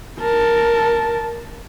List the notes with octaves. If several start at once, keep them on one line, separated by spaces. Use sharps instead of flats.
A#4 A5